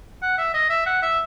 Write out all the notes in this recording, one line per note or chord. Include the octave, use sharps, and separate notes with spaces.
F#5
E5
D#5
E5
F#5
E5